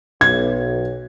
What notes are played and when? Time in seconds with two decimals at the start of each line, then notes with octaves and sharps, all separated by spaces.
0.21 B1 G#6